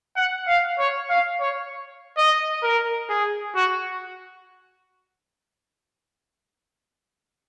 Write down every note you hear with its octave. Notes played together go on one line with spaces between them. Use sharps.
F#5
F5
C#5
F5
C#5
D#5
A#4
G#4
F#4